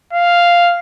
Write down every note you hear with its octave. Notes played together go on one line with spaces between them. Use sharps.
F5